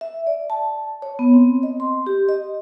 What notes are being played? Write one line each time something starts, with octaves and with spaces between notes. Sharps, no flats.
E5
D5
A5
C#5
B3
C4
D#5
C6
G4
D#5